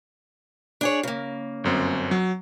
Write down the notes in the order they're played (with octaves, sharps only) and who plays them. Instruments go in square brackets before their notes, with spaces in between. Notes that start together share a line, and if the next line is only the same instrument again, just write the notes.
[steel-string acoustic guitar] D4 G#4 C#5
C#3 A#3
[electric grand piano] G1 F#2 C4
F#3